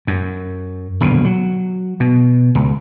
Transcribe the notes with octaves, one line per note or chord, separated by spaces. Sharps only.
F#2
D#1 B1 B2 D3
F#3
B2
C#2